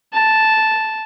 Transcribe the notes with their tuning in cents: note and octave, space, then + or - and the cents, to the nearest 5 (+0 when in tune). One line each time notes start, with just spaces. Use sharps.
A5 -5